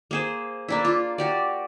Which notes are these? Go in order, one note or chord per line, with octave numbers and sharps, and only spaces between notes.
A#3 G#4 C5
A#3 D4 E4
F4
F#4 G4 D5